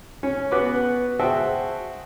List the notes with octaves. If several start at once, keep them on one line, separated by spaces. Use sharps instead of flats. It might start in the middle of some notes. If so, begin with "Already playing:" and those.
C#4
B3 F#4 B4 D6
F#4 G#4 C5 E5 G5 A5